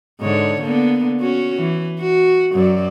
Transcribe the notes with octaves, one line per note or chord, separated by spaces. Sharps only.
G#2 D3 C#5
D3 A#3 B3
C#4 F#4
E3
F#4
F#2 F#3 D5